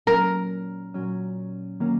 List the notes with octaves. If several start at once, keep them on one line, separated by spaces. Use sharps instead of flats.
A#2 F#3 C#4 A#4
A#2 F#3 C#4
D#3 F#3 A#3 C#4